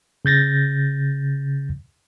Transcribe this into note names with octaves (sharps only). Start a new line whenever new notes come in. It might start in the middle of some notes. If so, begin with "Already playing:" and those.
C#3 G6 A6 A#6